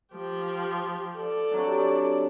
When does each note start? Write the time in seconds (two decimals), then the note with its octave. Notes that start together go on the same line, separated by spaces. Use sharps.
0.15 F3 G4
1.16 A4 D5
1.52 C3 F#3 D4